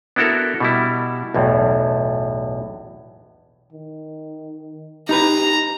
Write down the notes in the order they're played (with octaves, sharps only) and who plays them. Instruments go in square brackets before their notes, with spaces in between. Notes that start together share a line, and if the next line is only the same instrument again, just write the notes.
[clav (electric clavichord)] B3 D4 E4 F#4 A4 A#4
B2 G3 E4
B1 E2 A2
[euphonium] D#3
[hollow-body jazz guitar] D#4 B4 [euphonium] G4 [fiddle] A#5